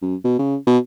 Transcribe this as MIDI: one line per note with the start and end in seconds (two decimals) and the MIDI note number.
0.02 0.15 42
0.24 0.34 47
0.39 0.56 49
0.67 0.78 47